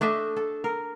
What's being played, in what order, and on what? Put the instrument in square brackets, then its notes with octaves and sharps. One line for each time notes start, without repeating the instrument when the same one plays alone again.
[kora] A3 D4 D#5 E5
A4
A#4